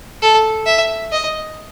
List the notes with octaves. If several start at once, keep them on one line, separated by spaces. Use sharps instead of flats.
A4
E5
D#5